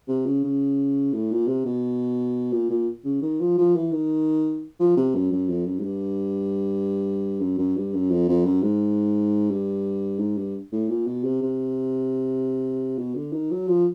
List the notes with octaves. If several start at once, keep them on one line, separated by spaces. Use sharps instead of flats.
C3
C#3
C#3
A2
A#2
C3
B2
A#2
A#2
C#3
D#3
F3
F3
E3
D#3
F3
C3
F#2
F#2
F2
F#2
G#2
G2
F#2
F#2
G2
F#2
F2
F2
F#2
G#2
G2
G#2
G2
A2
A#2
B2
C3
C3
B2
D3
D#3
F#3
F3